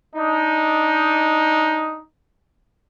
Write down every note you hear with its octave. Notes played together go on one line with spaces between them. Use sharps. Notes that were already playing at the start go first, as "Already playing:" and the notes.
D4 D#4